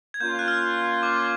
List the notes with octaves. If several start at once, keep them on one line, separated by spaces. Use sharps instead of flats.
G#6
A#3 C#4 F4 G6
F#6
F6
D6